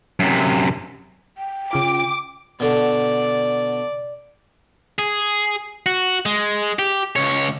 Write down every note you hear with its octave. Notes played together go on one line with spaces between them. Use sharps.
F#2 C3
G5
C#3 F4 D6
B2 D3 D5
G#4
F#4
G#3
G4
C#2 C#5